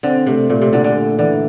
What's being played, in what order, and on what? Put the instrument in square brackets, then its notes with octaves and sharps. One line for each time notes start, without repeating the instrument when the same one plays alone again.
[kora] D3 [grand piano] C4
[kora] C3 [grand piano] A3
[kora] A#2 [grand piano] A3
[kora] C3
[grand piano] A#2 [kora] D3
[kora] D3
[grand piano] A3
[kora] D3 [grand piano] E3